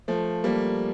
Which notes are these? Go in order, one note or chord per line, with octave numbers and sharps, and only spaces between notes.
F3 A3
G3 A#3